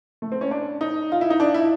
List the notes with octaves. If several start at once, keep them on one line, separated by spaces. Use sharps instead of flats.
A3
C4
C#4
D4
D#4
F4
E4
D#4
D4
E4